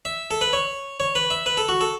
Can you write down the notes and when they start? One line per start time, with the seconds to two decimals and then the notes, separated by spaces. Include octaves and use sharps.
0.05 E5
0.31 A4
0.41 B4
0.53 C#5
1.00 C#5
1.15 B4
1.30 E5
1.46 B4
1.57 A4
1.69 F#4
1.81 A4